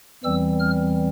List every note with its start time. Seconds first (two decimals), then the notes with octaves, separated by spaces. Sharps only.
0.24 E2 E3 G3 C4 E6
0.60 F6